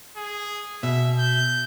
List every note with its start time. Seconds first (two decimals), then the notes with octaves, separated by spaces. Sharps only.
0.17 G#4
0.83 B2 E5
1.19 G6